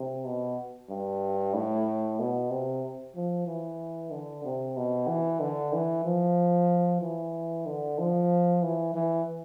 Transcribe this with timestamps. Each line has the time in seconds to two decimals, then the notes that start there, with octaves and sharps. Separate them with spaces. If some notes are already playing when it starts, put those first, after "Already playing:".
Already playing: C3
0.25 B2
0.89 G2
1.54 A2
2.19 B2
2.50 C3
3.16 F3
3.47 E3
4.11 D3
4.45 C3
4.77 B2
5.08 E3
5.41 D3
5.73 E3
6.05 F3
7.02 E3
7.66 D3
7.99 F3
8.63 E3
8.95 E3